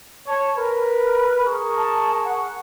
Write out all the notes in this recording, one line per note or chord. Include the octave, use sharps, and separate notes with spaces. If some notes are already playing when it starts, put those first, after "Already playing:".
C#5 A5
A#4 B4
G#4 A#4 C#6
A5
F#5